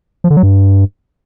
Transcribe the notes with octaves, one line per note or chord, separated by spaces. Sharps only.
F3
D3
F#3
G2